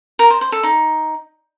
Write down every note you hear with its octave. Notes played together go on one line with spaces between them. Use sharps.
A#4
C5
C5
A4
D#4